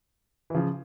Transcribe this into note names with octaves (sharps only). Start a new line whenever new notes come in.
E3
C#3 F3